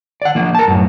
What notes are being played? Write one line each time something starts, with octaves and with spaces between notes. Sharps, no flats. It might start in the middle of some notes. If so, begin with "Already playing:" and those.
D5 F#5
F3 A#3
A#4 A5
F#2 A2